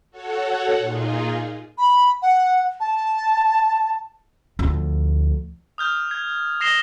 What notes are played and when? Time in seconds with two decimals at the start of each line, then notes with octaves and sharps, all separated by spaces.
0.11 F#4 A4 C#5 F#5
0.78 A#2 D#4 F4 G#4
1.78 B5
2.22 F#5
2.80 A5
4.59 D2 F3
5.78 D#6 F6 G6
6.11 G#6
6.60 D#6 A#6 C7 E7 G7